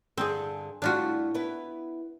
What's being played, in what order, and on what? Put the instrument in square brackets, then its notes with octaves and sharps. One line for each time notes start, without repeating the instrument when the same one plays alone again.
[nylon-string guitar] G2 D3 [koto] C4 G#4
[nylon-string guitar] A2 G3 [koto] D4 F4 F#4
[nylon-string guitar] B3 E4 B4